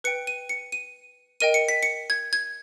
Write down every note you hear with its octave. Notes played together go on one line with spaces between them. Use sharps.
B4 G5 C#7
D#7
C#7
D#7
A#4 D#5 G5 D#7
C#7
B6
C#7
G#6
G#6